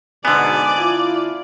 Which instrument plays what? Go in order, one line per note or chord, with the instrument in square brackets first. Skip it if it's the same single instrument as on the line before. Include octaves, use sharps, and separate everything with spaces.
[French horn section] D2 G#2 B2 [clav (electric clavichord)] D3 B3 [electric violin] D5 [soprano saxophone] G#5
[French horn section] E4 F4